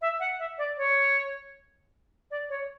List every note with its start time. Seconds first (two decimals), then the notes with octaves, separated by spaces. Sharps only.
0.01 E5
0.20 F#5
0.39 E5
0.58 D5
0.78 C#5
2.31 D5
2.49 C#5